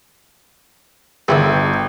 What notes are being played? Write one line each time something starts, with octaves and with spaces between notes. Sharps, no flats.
G1 D3 E4 G#4 G5